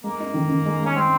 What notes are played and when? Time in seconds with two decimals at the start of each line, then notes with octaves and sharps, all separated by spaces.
0.04 G#3 A#3
0.20 D#4
0.34 D#3
0.49 D#3
0.65 G#3
0.80 G#3
0.86 C#4
0.96 G#3 C4